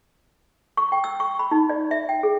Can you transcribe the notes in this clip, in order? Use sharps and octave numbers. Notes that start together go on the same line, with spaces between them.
C#6
G5
E6
C#6
B5
D#4
D5
E5
G5
G#4